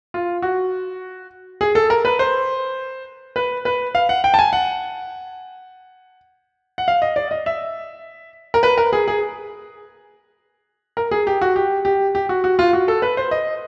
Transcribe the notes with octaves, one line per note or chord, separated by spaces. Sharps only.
F4
F#4
G#4
A4
A#4
B4
C5
B4
B4
F5
F#5
G5
A5
G#5
F#5
F#5
F5
D#5
D5
D#5
E5
A#4
B4
A#4
G#4
G#4
A#4
G#4
G4
F#4
G4
G4
G4
F#4
F#4
F4
F#4
A4
B4
C5
D#5